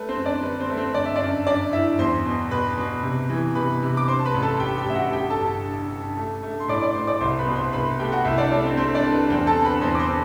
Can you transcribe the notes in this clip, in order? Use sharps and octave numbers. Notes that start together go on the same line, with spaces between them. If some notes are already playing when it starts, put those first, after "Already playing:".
Already playing: A3 B4
C4 C5
F#2
D4 D5
D3 B4
C4 C5
A3
C4 C5
G1 D5
E5
D4 D5
F#2
F#2 D4 D5
G1 E4 E5
E2 C5 C6
B2
B2 B4 B5
B2
C3
E3
C3 B4 B5
C3
D6
G2 C5 C6
A5
B4 B5
A1
A4 A5
A1 G4 G5
G4 G5
A1 E5
F#4 F#5
G1 G4 G5
A4 A5
G1
G2
G2
A3
A3
C6
A2 D5 D6
D5 D6
A2 C5 C6
D5 D6
C2 C5 C6
B4 B5
B2
C5 C6
C2 B4 B5
A3 G4 G5
F#4 F#5
C2 E4 E5
D4 D5
A3 D4 D5
C4 C5
A3 C4 C5
D4 D5
A3
B4
E2 C4 C5
A4 A5
D3
B4 B5
E2 C5 C6
D6
C5 C6
D3